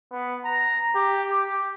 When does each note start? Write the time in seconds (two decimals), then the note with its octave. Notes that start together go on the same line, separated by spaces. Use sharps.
0.12 B3
0.45 A#5
0.95 G4
1.31 G4